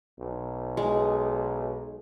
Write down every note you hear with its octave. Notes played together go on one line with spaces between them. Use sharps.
B1
G#3